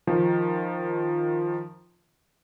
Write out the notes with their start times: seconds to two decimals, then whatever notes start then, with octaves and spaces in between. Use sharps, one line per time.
0.07 D#3 F3